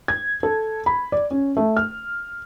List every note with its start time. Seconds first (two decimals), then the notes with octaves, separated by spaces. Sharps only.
0.08 G#6
0.43 A4
0.86 B5
1.12 D5
1.31 C#4
1.57 A3
1.77 F6